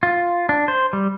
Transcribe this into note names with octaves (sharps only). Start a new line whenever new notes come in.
F4
D4
C5
G3